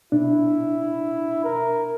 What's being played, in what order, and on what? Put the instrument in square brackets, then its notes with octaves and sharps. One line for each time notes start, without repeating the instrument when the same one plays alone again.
[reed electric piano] B2 D4 [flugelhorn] E4
[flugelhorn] A#4